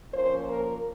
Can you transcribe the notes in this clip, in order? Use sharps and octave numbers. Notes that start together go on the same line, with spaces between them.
A#2 F3 A#3 C#4 C5
A#4